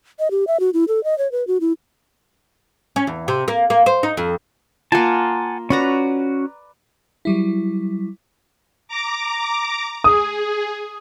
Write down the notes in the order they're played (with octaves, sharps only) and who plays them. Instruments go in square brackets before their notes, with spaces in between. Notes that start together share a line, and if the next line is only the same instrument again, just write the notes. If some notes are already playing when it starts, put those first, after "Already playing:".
[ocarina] D#5
G4
E5
F#4
E4
A4
D#5
C#5
B4
F#4
E4
[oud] C#4
E2
C3
A#3
A#3
C5
D#4
F2
[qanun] A#3 F4 [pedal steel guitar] F#5 G#5 A5
[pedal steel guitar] C#4 F#4 [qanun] B4 D5 A#5
[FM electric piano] F#3 G3 E4
[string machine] A#5 D6
[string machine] G#4 [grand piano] D#6